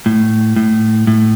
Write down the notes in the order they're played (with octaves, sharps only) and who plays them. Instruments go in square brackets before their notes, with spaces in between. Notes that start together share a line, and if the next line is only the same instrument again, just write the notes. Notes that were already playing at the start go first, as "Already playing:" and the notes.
[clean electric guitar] A2
A2
A2